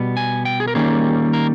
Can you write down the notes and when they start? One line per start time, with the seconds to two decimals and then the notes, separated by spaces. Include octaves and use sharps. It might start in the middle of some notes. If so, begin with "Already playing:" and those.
Already playing: B2 G3 B3
0.17 G#5
0.45 G5
0.60 G#4
0.68 A#4
0.75 D#3 G3 A#3 C#4 G#4
1.33 A#4